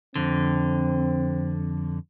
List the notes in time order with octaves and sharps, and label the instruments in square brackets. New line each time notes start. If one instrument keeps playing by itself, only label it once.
[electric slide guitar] F2 D3 [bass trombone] C4